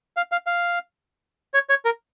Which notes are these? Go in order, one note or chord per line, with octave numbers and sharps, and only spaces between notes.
F5
F5
F5
C#5
C#5
A#4